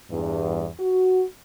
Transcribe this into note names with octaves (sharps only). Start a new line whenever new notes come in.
E2 G2
F#4